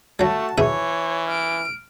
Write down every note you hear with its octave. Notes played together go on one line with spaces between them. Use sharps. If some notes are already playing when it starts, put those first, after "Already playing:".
F#3 G3 A3 F#4 A5
B1 E3 G#4 C#5 E5
F6 D7